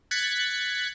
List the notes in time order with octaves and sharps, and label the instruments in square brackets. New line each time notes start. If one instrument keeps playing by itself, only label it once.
[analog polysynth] F#6 G#6 A6 B6 C#7